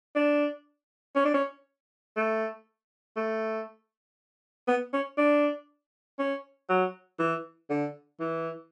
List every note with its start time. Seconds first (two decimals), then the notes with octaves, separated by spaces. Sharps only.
0.16 D4
1.15 C#4
1.25 D4
1.34 C#4
2.16 A3
3.17 A3
4.68 B3
4.93 C#4
5.18 D4
6.19 C#4
6.69 F#3
7.19 E3
7.70 D3
8.20 E3